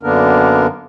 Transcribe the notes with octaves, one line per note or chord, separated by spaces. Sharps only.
F#2 D3 A#3 B3 D4 A#4